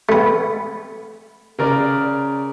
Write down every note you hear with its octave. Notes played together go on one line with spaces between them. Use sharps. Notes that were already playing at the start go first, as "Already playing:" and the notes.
A3 B3
C#3 A#4 D5